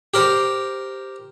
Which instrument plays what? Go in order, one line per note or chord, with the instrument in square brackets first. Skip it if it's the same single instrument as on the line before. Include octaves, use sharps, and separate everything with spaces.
[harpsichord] G4 A#4 C5